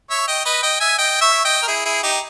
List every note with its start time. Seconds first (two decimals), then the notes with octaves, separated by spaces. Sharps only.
0.10 C#5 E5
0.28 D#5 G5
0.45 B4 D#5
0.63 D#5 G5
0.80 E5 G#5
0.98 D#5 G5
1.21 C#5 E5
1.45 D#5 G5
1.62 A#4
1.68 E4 G#4
1.85 E4 G#4
2.03 D#4 G4